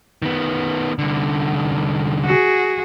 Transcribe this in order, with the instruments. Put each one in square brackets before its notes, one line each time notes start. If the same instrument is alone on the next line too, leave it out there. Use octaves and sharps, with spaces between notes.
[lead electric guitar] D#3 B3
C2 D3
[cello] F#4 G#4